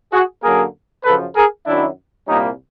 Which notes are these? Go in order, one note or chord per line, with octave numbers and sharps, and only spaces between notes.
F#4 G#4
F#2 D3 F#3 A#3 G#4 A#4
F#2 C#3 F3 A4 B4
G#4 A#4
F#2 D#3 F#3 D4 E4
C2 A#2 G3 A#3 C#4 D#4